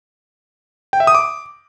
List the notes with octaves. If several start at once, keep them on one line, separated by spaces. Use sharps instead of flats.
G5
E5
D#6
D6